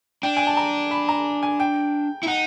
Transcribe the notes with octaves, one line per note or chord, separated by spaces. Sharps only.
D4 G5
G#5
A5
A#5
B5
A#5
G#5
G5
E4
D#4 F#5